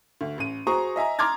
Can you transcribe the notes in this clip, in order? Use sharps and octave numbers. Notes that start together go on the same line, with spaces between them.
D2
A1 D#7
F#4 G#4 C5 A#5 C#6 D#6
D#5 E5 G#5 A#5
A#5 C6 D6 F6 G#6 A6